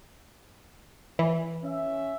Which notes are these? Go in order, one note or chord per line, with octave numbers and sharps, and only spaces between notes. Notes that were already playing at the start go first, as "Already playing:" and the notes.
E3
C#4 E5